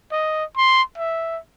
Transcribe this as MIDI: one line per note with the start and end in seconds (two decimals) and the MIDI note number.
0.12 0.44 75
0.57 0.82 84
0.98 1.39 76